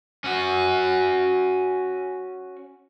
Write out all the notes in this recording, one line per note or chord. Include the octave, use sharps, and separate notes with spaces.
C#4 F#4